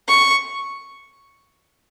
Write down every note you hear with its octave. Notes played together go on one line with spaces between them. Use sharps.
C#6